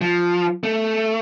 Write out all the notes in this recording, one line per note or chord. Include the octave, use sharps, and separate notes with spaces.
F3
A3